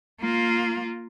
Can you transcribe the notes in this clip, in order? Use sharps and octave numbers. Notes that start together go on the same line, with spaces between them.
A#3 F4